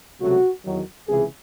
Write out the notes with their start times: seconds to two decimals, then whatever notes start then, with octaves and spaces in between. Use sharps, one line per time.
0.20 C#2 C3 F#3 A3 F#4
0.65 E2 D#3 F#3
1.08 C#2 C3 E3 G#4